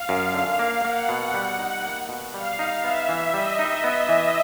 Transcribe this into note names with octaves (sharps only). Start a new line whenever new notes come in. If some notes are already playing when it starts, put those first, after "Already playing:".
Already playing: F5
F#2
D3
A#3
A#3 F#5
B2
G3
D#4
A#3
B2
G3 F5
D#4
B3 E5
E3
G3 D#5
D#4
B3
E3